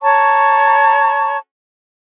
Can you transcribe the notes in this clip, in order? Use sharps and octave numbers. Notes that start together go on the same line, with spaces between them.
C#5 A5 A#5 C#6